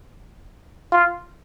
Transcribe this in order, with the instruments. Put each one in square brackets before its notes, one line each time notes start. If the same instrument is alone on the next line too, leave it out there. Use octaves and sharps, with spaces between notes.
[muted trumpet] F4